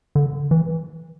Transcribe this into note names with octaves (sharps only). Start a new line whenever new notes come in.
D3
E3